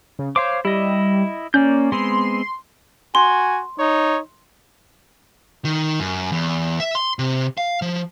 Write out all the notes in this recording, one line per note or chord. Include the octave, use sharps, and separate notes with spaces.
C#3
C5 C#5 F5 D6
G3 E4 D#5
A#3 C#4 D5 G6
G#3 B3 C4 C6
F#4 G#5 C6
D#4 C#5
D#3
F#2
E2
E5
C6
C3
F5
F3